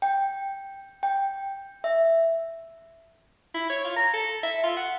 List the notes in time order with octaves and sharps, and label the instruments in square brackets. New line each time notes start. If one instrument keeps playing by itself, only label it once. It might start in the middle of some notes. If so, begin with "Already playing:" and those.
[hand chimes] G5
G5
E5
[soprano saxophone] E4
C#5
F4
A#5
A4
E5
F4
F#5